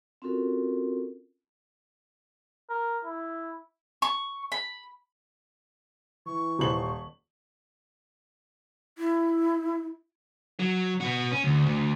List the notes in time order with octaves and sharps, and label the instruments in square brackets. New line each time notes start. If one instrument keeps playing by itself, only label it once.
[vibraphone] C4 C#4 F4 F#4 A4 A#4
[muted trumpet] A#4
E4
[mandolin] C#6
B5
[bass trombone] E3 [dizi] C#6
[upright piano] D#1 C5 F#7
[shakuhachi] E4
[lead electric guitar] F#3
B3 F#4
C#4
D2
D2